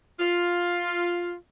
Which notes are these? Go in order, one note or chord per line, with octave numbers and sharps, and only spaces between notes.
F4